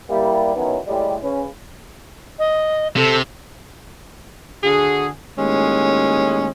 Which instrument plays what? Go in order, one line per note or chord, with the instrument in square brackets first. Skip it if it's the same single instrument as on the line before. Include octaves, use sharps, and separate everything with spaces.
[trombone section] G3 A#3 E4
D#3 F#3 B3 C#4 D#4 E4
A2 G3 G#3
C#3 C#4 B4
[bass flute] D#5
[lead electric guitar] C3 [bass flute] A4
[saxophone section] D3 F#4 G#4
D#2 A2 G#3 C#4